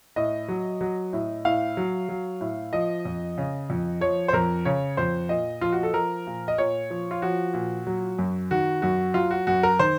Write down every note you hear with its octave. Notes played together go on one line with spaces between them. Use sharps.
A2 D#5
F#3
F#3
A2
A2 F5
F#3
F#3
A2
F3 D#5
F2
C#3
F2
F3 C#5
C5
F2 A#4
C#3 C#5
F2 C5
A#2 D#5
F3 F4
F#4
A4
F3 A#4
A#2
D#5
A#2 C#5
F3
F4
F3 F#4
A#2
F#3
F#2
D#3 F#4
F#2 F#4
F#3 F4
F#4
F#2 F#4
A#4
D#3 C5